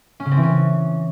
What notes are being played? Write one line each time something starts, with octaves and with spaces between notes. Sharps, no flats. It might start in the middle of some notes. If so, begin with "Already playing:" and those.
C#4
C#3
C4
E3
C#4